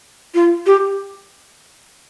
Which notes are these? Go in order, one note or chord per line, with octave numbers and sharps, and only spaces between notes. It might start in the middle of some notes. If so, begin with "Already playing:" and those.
F4
G4